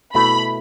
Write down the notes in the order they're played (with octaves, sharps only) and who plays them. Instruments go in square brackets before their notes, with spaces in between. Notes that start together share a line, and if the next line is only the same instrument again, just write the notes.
[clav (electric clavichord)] B2 A3 E4 [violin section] B5